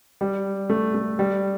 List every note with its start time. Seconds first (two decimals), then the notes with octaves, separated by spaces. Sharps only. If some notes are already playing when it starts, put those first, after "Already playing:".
0.21 G3
0.70 A3
0.94 A3
1.19 G3